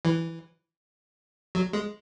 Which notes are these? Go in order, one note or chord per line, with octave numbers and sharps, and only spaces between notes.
E3
F#3
G#3